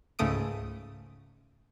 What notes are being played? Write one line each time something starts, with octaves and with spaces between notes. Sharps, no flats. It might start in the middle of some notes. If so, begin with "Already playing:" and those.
C#2 G#2 C#3 A3 D#6 D7